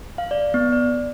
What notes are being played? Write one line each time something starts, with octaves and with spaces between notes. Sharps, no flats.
F5
D5
B3
D5